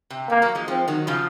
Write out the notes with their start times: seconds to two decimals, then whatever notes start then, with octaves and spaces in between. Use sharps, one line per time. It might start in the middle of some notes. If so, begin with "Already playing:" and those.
0.10 C3
0.29 C3 A#3
0.42 F#3 A#3
0.55 F3 G#3
0.68 F3 G#3 C4
0.88 D#3 F#3
1.07 C#3 F3